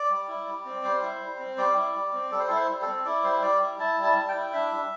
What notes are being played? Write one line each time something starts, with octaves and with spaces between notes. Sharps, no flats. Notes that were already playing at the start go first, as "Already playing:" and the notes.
Already playing: D5
G3
E4
G3
C4
G3 C5
E4
G3
C4
G3 D5
E4
G3
C4
G3 A4
C5
E4 A4
C5
G3
A4
C4
E4 D5
G3 C5
G3 D5
E4
E4 A5
G3
A5
G3
G5
E4
D4 E5
G3